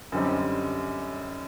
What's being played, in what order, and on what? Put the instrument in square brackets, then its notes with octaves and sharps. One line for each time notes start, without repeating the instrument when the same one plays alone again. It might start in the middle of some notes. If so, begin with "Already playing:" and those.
[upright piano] F#2 D3 G3 C4 D#4